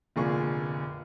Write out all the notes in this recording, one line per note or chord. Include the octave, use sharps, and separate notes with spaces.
F1 A#2 D3 A#3 G#4 C#6